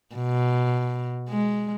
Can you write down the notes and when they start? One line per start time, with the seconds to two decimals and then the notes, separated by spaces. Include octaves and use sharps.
0.16 B2
1.29 G#3